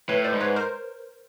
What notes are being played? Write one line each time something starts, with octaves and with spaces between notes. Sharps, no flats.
A2 B4 C#5
C5 D5
G#2
B4 C#5
A#4 C5